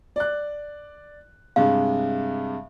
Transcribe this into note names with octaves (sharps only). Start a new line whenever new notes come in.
D5 F#6
G2 C3 G#3 F5